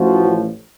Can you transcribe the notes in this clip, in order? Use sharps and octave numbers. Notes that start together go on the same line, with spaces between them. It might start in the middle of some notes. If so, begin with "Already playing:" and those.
Already playing: A1 A2 F3 F#4